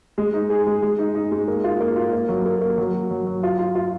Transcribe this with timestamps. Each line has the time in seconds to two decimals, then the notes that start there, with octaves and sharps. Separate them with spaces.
0.18 G#3
0.34 D#4
0.50 G#4
0.66 G#3
0.82 G#3
0.99 D#4
1.15 D#4
1.32 G#3
1.48 A#3
1.64 F4
1.81 A#3
1.96 F4
2.13 A#3
2.29 F#3
2.45 A#3
2.61 A#3
2.78 F#3
2.94 F#4
3.11 F#3
3.27 F#3
3.43 F4
3.59 F4
3.75 F4